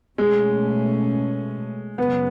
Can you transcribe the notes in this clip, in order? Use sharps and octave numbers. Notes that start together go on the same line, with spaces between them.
B2 G#3 A3 C#4
F#2 C#3 F#3 B3